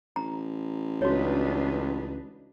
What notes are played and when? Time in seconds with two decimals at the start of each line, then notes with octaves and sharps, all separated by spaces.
0.16 A1 A#5
1.02 C#2 D4 D#4 F#4 B4 C#5